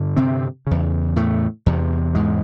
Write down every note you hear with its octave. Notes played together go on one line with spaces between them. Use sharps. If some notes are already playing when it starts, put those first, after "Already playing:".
Already playing: G2 D3
C3 C4
E2 C#3
A2 A3
E2 C3
G#2 G#3